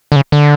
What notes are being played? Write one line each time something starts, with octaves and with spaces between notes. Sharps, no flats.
D3
C#3
D3